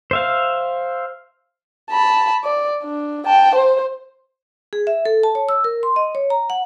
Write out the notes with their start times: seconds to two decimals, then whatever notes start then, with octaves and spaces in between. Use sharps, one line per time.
0.11 C5 E5 F5
1.91 A5 B5
2.44 D5
2.84 D4
3.26 G5 A5
3.55 C5
4.73 G#4
4.87 E5
5.06 A4
5.23 A5
5.35 C#5
5.49 E6
5.64 A#4
5.83 C6
5.96 D#5
6.15 C#5
6.30 A#5
6.50 F#5